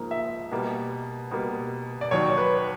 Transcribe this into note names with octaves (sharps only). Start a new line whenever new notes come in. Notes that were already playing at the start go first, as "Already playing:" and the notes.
Already playing: G#2 F3 A#3
E5
B2 G3 A#3
B2 G3 A#3
D5
D#2 D#3 F#3 C#5
B4